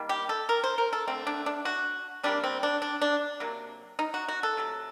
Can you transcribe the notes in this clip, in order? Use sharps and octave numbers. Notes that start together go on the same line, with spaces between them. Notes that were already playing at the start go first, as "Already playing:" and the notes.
Already playing: D#3 G3 A#3
G4
A4
A#4
C5
A#4
A4
D3 A3 C4
D4
D4
F#4
C3 G3 A#3 D4
C4
D4
D4
D4
C3 F#3 A#3
D#4
F#4
F#4
A4
C3 F#3 A3